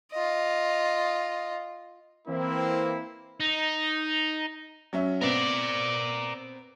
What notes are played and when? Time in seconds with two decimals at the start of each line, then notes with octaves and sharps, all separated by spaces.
0.12 F4 D#5
2.28 E3 A#3 C4 E4
3.40 D#4
4.93 F#3 C#4 E5
5.21 B3 C4 A#4 D5